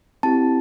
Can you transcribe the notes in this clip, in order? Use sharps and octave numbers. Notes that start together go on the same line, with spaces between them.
C4 E4 G4 A5